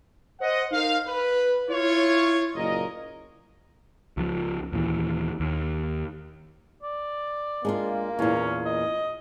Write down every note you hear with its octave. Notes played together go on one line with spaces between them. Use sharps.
C5 D#5 F#5
D#4 A#4 C5 F5
B4
E4 F4 C#5
F#1 A#2 A#4 D#5
C#2 F3
D#2 A#2 E3
D#2
D5
G#3 A#3 D4 F4
E2 A#2 C#4
D#5